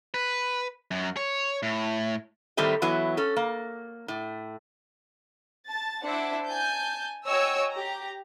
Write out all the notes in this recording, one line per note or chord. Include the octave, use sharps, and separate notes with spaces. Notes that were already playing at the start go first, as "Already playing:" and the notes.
B4
F#2
C#5
A2
A2 D#3 G3 A3 C4 D#5
E3 F#3 B3 E4
C#4 A4
A#3
A2
A5 A6
D4 E4 C5 E5 F#5 D6
G#5 A5 G6
F#4 C#5 D#5 G5 G#5 E6
G4 A#5